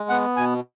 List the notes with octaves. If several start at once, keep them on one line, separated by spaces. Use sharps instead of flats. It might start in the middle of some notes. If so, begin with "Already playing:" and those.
Already playing: G#3
B3 F#5
B2 G#5